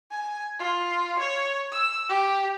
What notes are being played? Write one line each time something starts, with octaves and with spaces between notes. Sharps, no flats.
G#5
F4
C#5
E6
G4